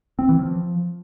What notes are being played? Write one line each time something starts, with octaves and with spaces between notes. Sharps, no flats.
C4
E3
F3